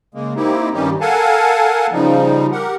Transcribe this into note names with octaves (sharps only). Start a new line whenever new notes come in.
C#3 G#3 A#3
A#3 C4 D#4 E4 G4
G2 D#3 G3 C#4 D#4 G4
A4 A#4 F5 F#5 G#5 A5
C#3 F3 G3 D#4
G4 A#4 F#5